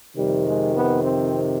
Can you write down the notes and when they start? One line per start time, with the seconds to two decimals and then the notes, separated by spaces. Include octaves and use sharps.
0.17 F2 C3 D#3 G3
0.46 G#3
0.75 B3
1.03 C4